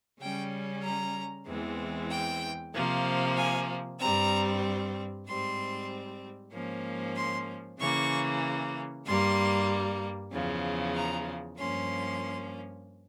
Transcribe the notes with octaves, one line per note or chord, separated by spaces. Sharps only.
C#3 G3 C#4 G5
A#5
E2 E3 G#3 C4
G5
C3 F3 A#3
G#5
G2 G3 C4 A#5
G#2 G3 C4 C6
G#2 F3 A#3 C#4
C6
C#3 E3 A#3 C#6
G2 G3 A#3 C6
E2 C#3 F3
A#5
G2 F3 A#3 C#4 C6